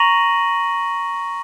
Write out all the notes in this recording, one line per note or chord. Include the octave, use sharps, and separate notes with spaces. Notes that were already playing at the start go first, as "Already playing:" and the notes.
Already playing: A#5 C#6 A#6 D#7 F#7